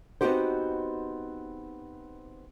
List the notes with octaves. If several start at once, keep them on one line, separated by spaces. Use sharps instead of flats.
B3 C4 D#4 F#4 G4 C5